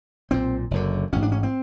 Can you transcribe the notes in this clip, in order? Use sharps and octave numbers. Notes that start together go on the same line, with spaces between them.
B1 A#2 C4
F#1 F#2 D3
A1 G#2 C#4
D4
C#4
C4